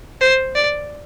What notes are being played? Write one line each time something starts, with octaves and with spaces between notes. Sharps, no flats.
C5
D5